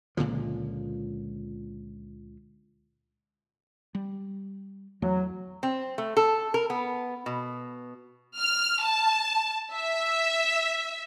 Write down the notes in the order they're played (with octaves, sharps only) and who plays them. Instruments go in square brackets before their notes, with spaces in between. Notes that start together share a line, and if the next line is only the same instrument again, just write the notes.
[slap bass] C#2 A#2 D3 F3
[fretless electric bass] G3
[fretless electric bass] E2 E3 A3 [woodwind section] F#3
[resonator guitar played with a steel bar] C4
A3
A4
A#4
B3
B2
[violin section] F6
A5
E5